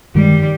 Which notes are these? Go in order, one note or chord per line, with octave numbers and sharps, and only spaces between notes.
G2 D#3 G3 G#3